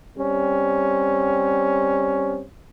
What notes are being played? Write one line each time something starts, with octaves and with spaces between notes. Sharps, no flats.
G3 C4 C#4